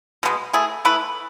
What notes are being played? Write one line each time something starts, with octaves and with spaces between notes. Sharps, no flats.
B2 G#3 B3
A3 E4 G#4
A3 E4 B4